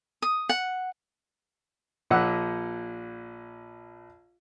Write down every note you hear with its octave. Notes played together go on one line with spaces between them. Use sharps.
D#6
F#5
A#1 A#2 F#5 E6